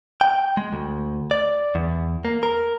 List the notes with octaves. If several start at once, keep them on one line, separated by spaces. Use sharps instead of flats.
G5
G#3
D2
D5
E2
A#3
A#4